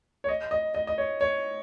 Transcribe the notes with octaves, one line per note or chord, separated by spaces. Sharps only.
C#5
D#5
D#5
D#5
D#5
C#5
C#5